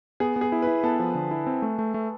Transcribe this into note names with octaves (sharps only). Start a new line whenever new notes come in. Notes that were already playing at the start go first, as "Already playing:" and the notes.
B3 G#4
B3
G#4
E4
E4 B4
B3 A4
F3
D3
E4
C4
A3
A3
A3